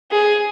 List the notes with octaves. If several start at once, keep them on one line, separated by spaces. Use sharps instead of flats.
G#4